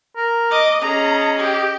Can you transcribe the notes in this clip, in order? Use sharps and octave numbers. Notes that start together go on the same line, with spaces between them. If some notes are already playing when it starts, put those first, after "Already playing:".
A#4
D#5 D6
C#4 G#4 D#5 A#5
G4